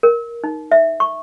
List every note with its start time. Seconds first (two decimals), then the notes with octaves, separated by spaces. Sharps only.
0.03 A#4
0.44 D#4
0.72 E5
1.00 C#6